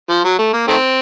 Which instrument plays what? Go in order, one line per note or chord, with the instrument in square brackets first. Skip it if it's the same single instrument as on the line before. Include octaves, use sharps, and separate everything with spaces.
[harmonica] F3
F#3
A3
A#3
D#3 A3 C4